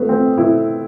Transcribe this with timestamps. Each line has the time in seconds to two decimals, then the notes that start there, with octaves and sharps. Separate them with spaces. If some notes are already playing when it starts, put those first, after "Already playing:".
Already playing: A3 B3
0.09 C4
0.38 B2 E4